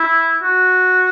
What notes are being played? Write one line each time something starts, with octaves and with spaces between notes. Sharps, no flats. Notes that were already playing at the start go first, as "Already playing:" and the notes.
Already playing: E4
F#4